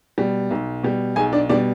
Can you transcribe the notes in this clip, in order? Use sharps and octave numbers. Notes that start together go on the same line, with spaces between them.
B2 G3
B1
B2 G3
B1 G#4 G#5
D4 D5
B2 G3 D4 D5